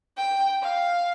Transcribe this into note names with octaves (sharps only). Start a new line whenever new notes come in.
G5
F5